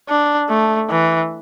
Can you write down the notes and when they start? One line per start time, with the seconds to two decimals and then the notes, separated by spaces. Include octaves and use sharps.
0.09 D4
0.49 A3
0.90 E3